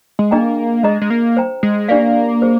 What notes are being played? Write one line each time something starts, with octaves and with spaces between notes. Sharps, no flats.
G#3
A#3 D4 G#4 D#5 G5 A#5
G#3 G#4 D#5 A#5
G#3
A#3
C5 G5 A#5
G#3
A#3 D4 G4 D5 F5
G#4 C5